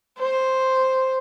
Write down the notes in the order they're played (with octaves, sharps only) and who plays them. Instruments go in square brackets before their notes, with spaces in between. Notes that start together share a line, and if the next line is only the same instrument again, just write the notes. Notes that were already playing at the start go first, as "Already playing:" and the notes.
[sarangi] C5